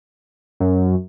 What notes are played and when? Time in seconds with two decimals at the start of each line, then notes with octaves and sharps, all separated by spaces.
0.60 F#2